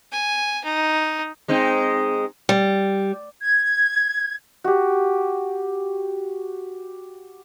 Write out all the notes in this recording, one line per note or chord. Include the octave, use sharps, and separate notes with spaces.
G#5
D#4
G#3 C4 D#4
G3
G#6
F#4 G4